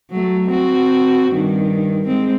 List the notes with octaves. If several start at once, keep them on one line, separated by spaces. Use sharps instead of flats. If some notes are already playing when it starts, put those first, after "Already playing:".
F#3 A3
C4 F#4
G2 D#3
G#3 C4